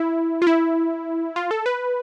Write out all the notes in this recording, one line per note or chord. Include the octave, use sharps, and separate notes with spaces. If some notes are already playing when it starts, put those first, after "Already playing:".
Already playing: E4
F4
E4
F4
A4
B4